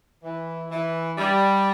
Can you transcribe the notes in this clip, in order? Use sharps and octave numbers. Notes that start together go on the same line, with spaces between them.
E3
E3
G3